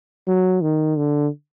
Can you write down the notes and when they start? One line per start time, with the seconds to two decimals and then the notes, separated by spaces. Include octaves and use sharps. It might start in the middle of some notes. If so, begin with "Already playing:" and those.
0.27 F#3
0.62 D#3
0.97 D3